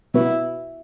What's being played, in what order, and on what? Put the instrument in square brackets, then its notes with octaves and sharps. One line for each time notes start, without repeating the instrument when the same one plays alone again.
[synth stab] B2 B3 F#4 [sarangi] E4